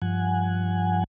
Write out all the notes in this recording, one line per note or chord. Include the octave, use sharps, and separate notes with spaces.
G2 F3 F#5 G#5